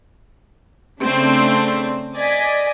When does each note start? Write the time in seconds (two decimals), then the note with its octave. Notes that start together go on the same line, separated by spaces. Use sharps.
1.01 C#3 A3 C4 D4
2.15 D5 D#5 G#5 B6